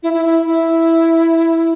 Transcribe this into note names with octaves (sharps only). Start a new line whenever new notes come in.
E4
E4
E4
E4